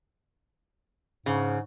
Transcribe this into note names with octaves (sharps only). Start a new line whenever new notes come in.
G#2 C#3